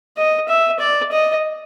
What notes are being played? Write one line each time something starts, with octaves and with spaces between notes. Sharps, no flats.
D#5
E5
D5
D#5